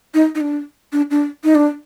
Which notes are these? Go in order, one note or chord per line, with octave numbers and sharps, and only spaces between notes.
D#4
D#4
D4
D4
D4
D#4
D4